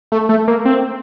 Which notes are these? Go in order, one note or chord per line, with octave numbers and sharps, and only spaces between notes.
A3
A3
A#3
C4